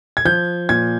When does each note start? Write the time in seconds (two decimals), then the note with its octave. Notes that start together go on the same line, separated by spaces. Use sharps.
0.17 G#6
0.25 F3 G6
0.69 A#2 G#6